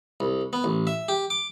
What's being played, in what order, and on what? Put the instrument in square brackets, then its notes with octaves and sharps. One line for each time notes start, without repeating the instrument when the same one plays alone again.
[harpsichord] C2
B3
A1
E5
G4
D6